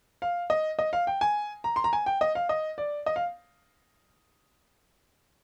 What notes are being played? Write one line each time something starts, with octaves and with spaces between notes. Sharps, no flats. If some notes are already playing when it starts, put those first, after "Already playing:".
F5
D#5
D#5
F5
G5
G#5
A#5
C6
A#5
G#5
G5
D#5
F5
D#5
D5
D#5
F5